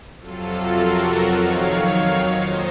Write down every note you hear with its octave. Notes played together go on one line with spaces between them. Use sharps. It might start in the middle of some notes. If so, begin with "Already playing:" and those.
F2 C3 F#3 F4 A4
F#4 A#4
F2 D#3 F#3 C#5 F5
C#5 F5
A#2 F3 C5 D#5